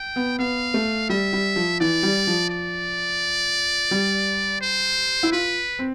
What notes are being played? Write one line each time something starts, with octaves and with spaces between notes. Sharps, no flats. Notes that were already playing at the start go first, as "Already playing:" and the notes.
Already playing: G5
B3
B3 F5
A3
G3 E5
G3
F3
E3 D5
G3
F3
D5
G3
C5
E4
F4 B4
C4